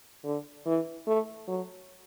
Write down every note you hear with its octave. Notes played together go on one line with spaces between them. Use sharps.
D3
E3
A3
F#3